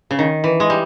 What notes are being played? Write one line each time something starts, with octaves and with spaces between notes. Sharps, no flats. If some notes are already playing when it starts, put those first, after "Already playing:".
C#3
D#3
E3
G#3
G3